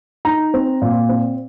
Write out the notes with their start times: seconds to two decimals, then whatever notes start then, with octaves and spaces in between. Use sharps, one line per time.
0.25 D#4 A#5
0.54 C4
0.82 A#2
1.09 C4